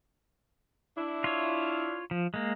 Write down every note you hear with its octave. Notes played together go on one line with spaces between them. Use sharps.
D4 E4
F4 C#5
F3
G#3 A#3